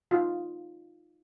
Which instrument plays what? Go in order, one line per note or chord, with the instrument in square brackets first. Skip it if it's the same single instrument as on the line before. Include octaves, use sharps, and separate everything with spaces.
[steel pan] D#4 F4